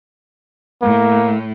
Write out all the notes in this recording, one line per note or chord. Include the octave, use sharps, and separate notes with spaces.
A2 A#3